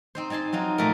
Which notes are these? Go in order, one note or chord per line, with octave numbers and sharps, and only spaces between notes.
C4 D#4 C5
C4 D#4 G#5 A5 C6
F#3 C4 D#4 F4
F2 A#2 F#3 A3 F#4 A#4